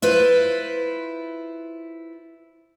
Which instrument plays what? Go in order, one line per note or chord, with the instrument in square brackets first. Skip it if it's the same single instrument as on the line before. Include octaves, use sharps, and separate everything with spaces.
[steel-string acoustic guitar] E4 F4 B4 C5